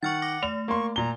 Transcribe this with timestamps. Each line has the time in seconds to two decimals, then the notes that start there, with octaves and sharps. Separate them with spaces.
0.03 D#3 F#5 C#6 F6 A6
0.22 D6 A#6
0.43 A3 F7
0.68 A#3 C6 C#6
0.96 A#2 A#5 G7